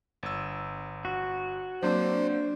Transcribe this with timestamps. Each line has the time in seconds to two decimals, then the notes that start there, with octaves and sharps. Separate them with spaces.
0.23 G1 E6
1.05 F#4
1.83 F#3 A#3 C4 D4 C5 D5